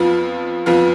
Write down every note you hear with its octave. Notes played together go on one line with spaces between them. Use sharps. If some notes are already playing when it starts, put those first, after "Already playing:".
Already playing: F2 F3 B3 F4
F2 F3 B3 F4